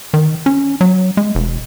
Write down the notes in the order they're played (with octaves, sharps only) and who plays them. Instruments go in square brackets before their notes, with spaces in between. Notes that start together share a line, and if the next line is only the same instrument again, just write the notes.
[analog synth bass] D#3
C#4
F#3
G#3
E1